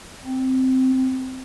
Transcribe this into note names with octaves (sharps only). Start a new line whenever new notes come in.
C4